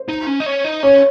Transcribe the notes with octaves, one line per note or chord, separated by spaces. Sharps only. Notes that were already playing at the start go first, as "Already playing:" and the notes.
Already playing: C5
D#4
C#4
D#4
C#4
D#4
C#4 C#5